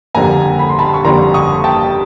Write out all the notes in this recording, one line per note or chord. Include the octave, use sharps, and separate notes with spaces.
F#1 F2 D3 G3 A#3 G#5 A#5
B5
C6
A5 B5
C#6
F#1 F2 D3 G3 A#3 A#5 C6
C#6 D#6
G5 A5